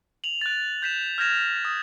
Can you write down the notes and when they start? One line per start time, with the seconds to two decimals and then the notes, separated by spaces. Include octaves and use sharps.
0.24 F7 F#7
0.41 F#6 A6
0.82 G6 B6 E7
1.18 F6 G6 G#6 A#6 E7 F7
1.65 D#6